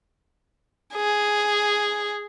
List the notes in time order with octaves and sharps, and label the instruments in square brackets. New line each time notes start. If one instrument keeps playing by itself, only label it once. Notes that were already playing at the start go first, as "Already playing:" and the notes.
[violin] G#4